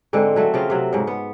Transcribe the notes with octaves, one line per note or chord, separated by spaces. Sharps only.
G#2 D3 G#3 C4
F#3 A3 C4
C#3 F3 C4 F4
C3 F#3
G#2 C#3
B3